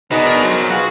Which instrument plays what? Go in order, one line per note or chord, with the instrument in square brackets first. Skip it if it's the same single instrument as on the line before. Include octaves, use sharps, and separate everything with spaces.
[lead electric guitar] B2 [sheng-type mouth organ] D4 G#4 F#5 [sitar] D#4 D#5
[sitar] A#4
[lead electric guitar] B1 F#3 [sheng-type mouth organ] C5
[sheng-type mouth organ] F4 G#4 B4 [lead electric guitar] F#4